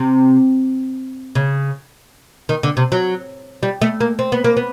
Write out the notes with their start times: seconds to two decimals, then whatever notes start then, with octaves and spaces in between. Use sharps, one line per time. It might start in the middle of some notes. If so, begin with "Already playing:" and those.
Already playing: C3
1.35 C#3
2.49 D#3
2.63 D3
2.77 C3
2.92 F#3
3.63 G3
3.81 A3
4.00 A#3
4.19 C4
4.32 B3
4.44 A#3
4.57 B3